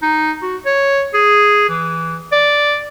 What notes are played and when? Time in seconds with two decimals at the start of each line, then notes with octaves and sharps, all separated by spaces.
0.02 D#4
0.42 F#4
0.66 C#5
1.14 G#4
1.69 E3
2.32 D5